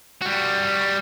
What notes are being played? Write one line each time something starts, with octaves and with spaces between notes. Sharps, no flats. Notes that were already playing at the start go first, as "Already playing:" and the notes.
G3 F#4